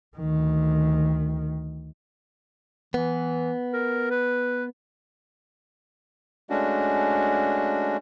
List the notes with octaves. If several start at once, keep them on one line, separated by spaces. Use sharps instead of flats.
D2 D#3
E3 B3
A#4
B4
G#3 A3 C#4 D4 F#4